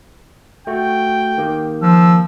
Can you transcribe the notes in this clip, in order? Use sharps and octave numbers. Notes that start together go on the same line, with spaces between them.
A3 F#4 G5
D#3 A#3 G4
F3 E6